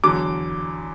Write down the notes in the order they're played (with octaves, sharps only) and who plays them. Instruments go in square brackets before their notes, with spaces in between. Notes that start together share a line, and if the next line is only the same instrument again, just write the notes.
[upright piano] E2 D3 F#3 D6